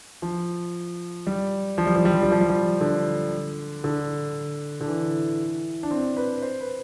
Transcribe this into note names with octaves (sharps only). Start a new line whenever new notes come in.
F3
G3
F3
G3
F3
G3
F3
G3
F3
G3
F3
D3
D3
D3
E3
D4
C4
B4
C5
B4